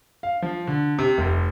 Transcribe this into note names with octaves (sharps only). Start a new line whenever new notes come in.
F5
F3
D3
C3
F1